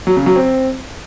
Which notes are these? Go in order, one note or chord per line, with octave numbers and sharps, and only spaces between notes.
F#3
C#3
F#3
C4